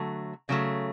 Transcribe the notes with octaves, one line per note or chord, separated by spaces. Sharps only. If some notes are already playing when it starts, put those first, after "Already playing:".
Already playing: D3 F#3 A3
C#3 F#3 A3